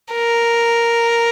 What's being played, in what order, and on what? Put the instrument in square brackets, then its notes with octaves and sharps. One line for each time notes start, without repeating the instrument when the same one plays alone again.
[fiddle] A#4